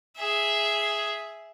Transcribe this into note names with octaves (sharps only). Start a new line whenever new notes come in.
G#4 E5